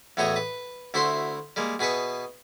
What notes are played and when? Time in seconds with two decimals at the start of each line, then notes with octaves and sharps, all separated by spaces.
0.17 E2 A2 A3 F#4 C#5 D#5
0.36 B4
0.94 D2 E4 F#4 C5 B5 C6
1.56 G3 G#3 A#3
1.79 B2 G#4 B4 E5 C#6